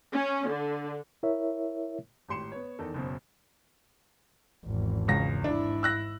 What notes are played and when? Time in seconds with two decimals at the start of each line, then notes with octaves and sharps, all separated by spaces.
0.14 C#4
0.49 D3
1.23 E4 A#4 C#5 E5
2.29 G#1 A2 G4 C6 C#7 E7
2.52 B3 C#5
2.79 E2 D#3 A4
2.94 F#1 B2 F#3 C5
4.66 G#1 E2
5.08 C#2 C#3 A#6
5.44 G#2 D4 E4
5.83 E6 F#6 A#6